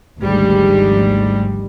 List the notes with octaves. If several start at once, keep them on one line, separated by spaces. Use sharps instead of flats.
G#1 D2 D#3 F3 G3 G#3